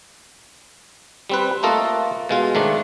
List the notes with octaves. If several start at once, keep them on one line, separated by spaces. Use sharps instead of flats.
G3 C4 B4
A3 A#3 F4 A4 D#5
B2 G#3 F4
G#2 D#3 A3 D4